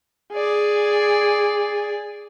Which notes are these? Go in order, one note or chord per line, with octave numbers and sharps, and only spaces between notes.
G#4 D5